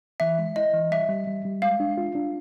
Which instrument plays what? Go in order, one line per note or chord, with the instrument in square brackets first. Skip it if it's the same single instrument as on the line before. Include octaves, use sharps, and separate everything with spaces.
[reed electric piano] E3 [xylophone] E5
[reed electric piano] G#3
[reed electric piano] E4 [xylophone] D#5
[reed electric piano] E3
[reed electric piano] G3 [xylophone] E5
[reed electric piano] G3
G3
G3
[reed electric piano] G#3 [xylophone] F5
[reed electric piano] D4
F4
D4